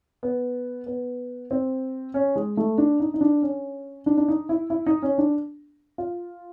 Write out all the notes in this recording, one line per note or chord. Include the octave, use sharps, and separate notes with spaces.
B3
B3
C4
C#4
G#3
A3
D4
D#4
D#4
D4
C#4
D4
D4
D#4
E4
E4
D#4
C#4
D4
F4